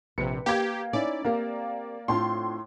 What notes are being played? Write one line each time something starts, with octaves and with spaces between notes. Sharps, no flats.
A#1 C3 B4 C#7
A#3 G4 G#6
C#4 D#4 E4 D5
A#3 C4 G4 A#4
A2 C4 D4 F4 C6